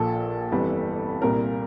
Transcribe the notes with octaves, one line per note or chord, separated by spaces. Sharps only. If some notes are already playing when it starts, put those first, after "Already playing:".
Already playing: A#1 A#2 F3 A4
G1 F2 E3 G3
C2 A#2 G3 A#4